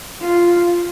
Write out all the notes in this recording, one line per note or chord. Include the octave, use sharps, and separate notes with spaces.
F4